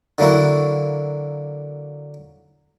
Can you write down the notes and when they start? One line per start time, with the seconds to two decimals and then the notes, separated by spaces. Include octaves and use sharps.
0.18 D3 F#3 A#3 E4 F#4